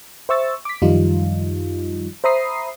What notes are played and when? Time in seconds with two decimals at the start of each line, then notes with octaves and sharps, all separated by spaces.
0.29 C5 E5 C#6 E6 A6
0.65 D6 B6
0.82 F#2 D#3 F3 G3 D#4 F4
2.24 C5 E5 A#5 B5 D#6 C7